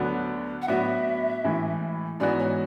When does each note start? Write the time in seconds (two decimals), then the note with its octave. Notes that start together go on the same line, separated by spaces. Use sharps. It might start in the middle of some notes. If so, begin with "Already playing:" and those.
Already playing: D2 D3 F#3 B3 D4
0.62 F#5
0.68 A2 F#3 B3 D4 F#4 E5
1.44 A2 E3 G#3
2.20 G#2 E3 G#3 B3 F#4 D5
2.39 C#5